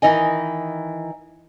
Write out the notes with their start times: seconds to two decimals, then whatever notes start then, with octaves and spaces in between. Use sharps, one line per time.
0.02 D#3 E3 D#4 D#5 G#5